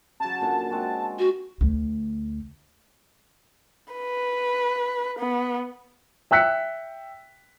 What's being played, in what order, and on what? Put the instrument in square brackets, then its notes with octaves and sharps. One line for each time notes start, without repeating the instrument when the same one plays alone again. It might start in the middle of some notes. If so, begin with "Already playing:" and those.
[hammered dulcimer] C#3 F#3 [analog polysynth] A5
[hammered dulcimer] A#2 D3
G#3 C4 F#4
[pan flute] F#4
[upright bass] D2 A3
[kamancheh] B4
B3
[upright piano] E5 G5 E6 F#6 B6 C#7